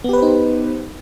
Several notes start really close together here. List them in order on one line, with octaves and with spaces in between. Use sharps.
B3 G4 B4 C5 D#4